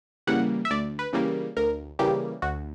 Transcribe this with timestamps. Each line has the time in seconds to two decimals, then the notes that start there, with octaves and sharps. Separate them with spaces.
0.27 C#3 E3 G3 A#3 F#5
0.65 E5
0.71 D2 D5
0.99 B4
1.13 C#3 E3 G3 A#3
1.57 D2 A#4
1.99 C#3 E3 G3 A#3 G4
2.42 D2 F#4